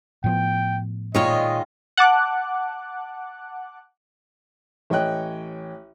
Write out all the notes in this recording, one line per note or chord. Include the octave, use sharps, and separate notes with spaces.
A2 F3 B3 G5
A#2 D#3 G#3 F4 C#5 D#5
F#5 A5 D6 F#6
A1 C#5 D#5 G5 F#6